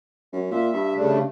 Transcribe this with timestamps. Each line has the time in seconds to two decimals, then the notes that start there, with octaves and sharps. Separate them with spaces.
0.33 F#2
0.51 A#2 E5
0.73 G2
0.94 C#3 A3 D4